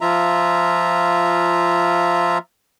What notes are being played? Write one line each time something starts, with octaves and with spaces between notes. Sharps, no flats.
F3 F4 E5 A#5